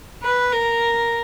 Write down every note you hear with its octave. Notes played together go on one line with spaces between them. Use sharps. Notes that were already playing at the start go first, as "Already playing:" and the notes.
B4
A#4